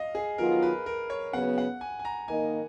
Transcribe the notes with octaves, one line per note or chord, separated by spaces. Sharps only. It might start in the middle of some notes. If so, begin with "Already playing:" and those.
Already playing: D#5 F5
G#4
D#3 F#3 B3 F4 A#4
B4
A#4
C#5
C#3 F#3 B3 F#5
F#5
G#5
G#5
A#5
D#3 A#3 D#4 A#4 D#5 G#5